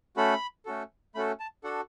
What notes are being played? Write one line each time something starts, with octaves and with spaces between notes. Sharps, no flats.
A3 C#4 F#4 A4 B5
A3 C#4 F#4 A4
A3 C#4 F#4 A4 B5
A5
D4 F#4 A4 F#5